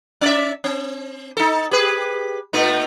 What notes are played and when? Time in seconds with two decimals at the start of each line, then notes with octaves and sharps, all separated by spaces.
0.21 C#4 D5 E5
0.64 C4
1.37 D#4 A4
1.71 G4 G#4 B4
2.53 A#2 A3 D#4